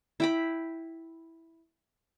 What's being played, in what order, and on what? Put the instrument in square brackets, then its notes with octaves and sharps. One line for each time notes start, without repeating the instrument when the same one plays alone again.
[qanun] E4 G5 B5